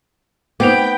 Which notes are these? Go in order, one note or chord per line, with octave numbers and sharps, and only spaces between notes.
B3 D#4 C5 G5 D6